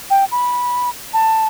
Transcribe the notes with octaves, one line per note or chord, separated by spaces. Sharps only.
G5
B5
A5